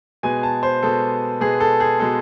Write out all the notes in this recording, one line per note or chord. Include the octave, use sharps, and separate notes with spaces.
B2 G#3 B3 G#5
A5
C5
B2 G#3 B3 A4
B2 G#3 B3 G#4
A4
G#4
B2 G#3 B3 A4